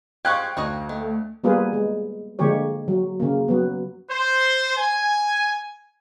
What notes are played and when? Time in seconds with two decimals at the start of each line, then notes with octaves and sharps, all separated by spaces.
0.25 F3 G#3 G4 F5 G5 C#6 F#6 G#6
0.57 D2 D#4 F#4 D#5
0.89 D#3 A3
1.44 G3 A#3 B3 F4 G#4 B4
1.73 G#3
2.39 D3 F3 G#3 A#3 G4 C#5
2.88 F#3
3.20 C#3 A#3
3.48 F#3 B3
4.10 C5
4.77 G#5